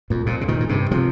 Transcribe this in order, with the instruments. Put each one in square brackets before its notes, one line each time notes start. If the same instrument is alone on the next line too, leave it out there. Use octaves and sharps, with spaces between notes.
[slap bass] F2 A#2
F2 A#2
C3
A#2 D#3
A#2
G2 C3
C3 F3